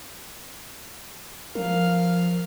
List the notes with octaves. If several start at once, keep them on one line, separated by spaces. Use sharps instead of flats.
F3 A#4 F5